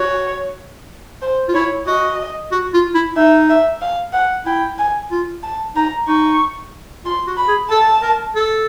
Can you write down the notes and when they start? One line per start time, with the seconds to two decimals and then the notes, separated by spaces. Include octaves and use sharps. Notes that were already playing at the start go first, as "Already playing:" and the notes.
Already playing: F#4 C#5
1.22 C5
1.48 F4
1.54 E4 C#5
1.87 F#4 D#5
2.52 F#4
2.73 F4
2.94 E4
3.16 D#4 E5
3.49 E5
3.81 F5
4.13 F#5
4.45 E4 G5
4.78 G#5
5.11 F4
5.43 A5
5.76 D#4 A#5
6.08 D#4 C#6
7.05 F4 C6
7.27 F#4
7.37 B5
7.48 G#4
7.70 A4 A5
8.02 A#4
8.35 A4